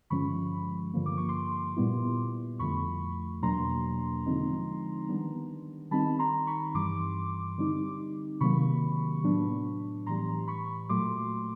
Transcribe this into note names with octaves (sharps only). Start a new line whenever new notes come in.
G2 D3 F3 G#3 C#4 B5 C#6
G2 D3 F3 A#3
D6
C#6
C6 D6
A#2 G3 B3 E4
F2 D3 F3 A3 B5 C#6
E2 B2 F#3 A#3 D4 A#5 C6
D3 F3 G#3 C4 D#4
D#3 G3 B3 D4
D#3 G3 C4 D#4 A5 B5
A#5 C6
B5 C#6
G2 E3 G3 C6 D6
D3 G3 C4 D#4
C3 D#3 F#3 A#3 B5 C#6
A2 F#3 B3 D4
A2 E3 G3 A#5 C6
B5 C#6
A#2 F#3 A3 C6 D6